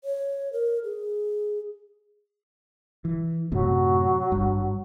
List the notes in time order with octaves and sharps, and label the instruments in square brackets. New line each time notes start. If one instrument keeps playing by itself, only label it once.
[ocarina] C#5
A#4
G#4
[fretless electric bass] E3
[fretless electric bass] F#2 A2 C3 [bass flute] F#3
[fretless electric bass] G#1 G2